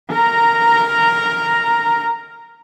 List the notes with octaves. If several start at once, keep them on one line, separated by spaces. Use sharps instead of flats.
A#4 A#5